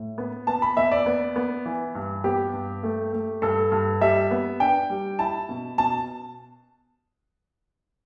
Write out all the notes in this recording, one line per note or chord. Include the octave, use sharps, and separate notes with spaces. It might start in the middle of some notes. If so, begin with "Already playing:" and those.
Already playing: A2
B3
B3 A5
B5
E2 E5
D5
B3
B3
E3
G2
B3 G4
G2
A3
A3
G2 A4
G2
G3 E5
B3
D4 G5
G3
E4 A5
B2
B2 A5